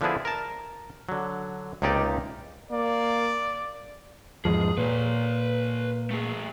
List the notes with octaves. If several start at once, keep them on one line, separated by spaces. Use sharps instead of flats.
D3 F3 B3 D4 E4 G#4
A#4 A5
D3 F#3
C#2 C3 A#3 D#4 G4 D5
A#3 D5
E2 G#2 F3 G#4
A#2 B4 C#5
A3 G#4